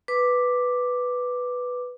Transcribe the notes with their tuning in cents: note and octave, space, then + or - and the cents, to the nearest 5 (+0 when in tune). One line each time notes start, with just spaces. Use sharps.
B4 +0 D6 +0